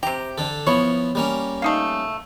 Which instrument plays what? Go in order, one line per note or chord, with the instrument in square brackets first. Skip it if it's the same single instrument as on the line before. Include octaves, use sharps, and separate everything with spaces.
[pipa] C3 G4 [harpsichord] A#5
[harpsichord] D3 A4
[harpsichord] F3 B3 E4 [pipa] C#5
[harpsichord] G3 A#3 C#4
[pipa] A3 D#4 F5